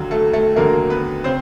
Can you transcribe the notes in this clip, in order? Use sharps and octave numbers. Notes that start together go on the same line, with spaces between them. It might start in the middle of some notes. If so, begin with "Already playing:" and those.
Already playing: D#2 D3 F#3
A3 A4
A3 A4
D#2 D3 F#3 A3 A#3 A#4
B3 B4
C#3 C4 C5